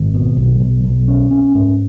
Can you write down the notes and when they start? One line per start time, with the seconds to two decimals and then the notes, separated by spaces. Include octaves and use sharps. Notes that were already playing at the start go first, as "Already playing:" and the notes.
Already playing: G#1
0.14 B2
0.37 B1
0.60 B1
0.84 B1
1.08 C#4
1.31 C#4
1.55 G#2